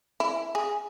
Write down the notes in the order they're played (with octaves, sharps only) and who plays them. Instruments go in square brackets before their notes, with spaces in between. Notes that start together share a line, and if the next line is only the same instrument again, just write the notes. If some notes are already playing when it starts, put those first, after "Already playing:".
[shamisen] E4
G#4